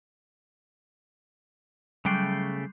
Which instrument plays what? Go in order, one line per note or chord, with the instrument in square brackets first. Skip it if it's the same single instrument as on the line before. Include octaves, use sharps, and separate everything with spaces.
[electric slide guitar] C#3 A3 G5 [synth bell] F#3 G3 C7